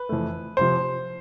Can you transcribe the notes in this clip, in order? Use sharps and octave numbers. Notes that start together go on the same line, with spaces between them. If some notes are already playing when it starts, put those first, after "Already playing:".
Already playing: B4
F2 E3 A3
C3 F3 C5